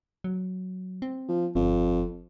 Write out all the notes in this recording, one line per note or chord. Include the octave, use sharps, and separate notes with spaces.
F#3
C4
F3
G1 F2